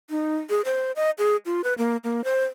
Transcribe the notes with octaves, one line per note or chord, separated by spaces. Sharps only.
D#4
G#4
C5
D#5
G#4
F4
B4
A#3
A#3
C5